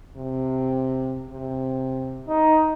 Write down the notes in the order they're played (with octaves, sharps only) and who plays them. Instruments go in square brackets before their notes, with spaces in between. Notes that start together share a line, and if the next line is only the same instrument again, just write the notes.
[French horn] C3
C3
[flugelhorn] D#4